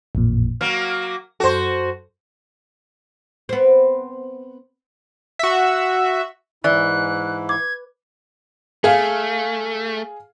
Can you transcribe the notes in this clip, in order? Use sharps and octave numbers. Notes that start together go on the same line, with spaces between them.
A1 F2 A#2
F#3 A#3 F6
F#2 F#4 A4 C5
B3 C4
F#4 E5
G#2 E3 E4 D5 F#6
D6 G#6
A3 G#4 F5